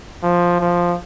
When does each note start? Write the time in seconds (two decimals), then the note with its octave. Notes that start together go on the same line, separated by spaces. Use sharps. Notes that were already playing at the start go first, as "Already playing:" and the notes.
0.23 F3
0.61 F3